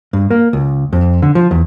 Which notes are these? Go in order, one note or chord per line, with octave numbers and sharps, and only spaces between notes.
G2
A#3
C#2
F2
D3
F3
E2